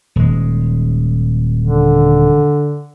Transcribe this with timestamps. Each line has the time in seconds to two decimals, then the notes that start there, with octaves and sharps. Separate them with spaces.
0.16 D#1 G#3
1.61 D3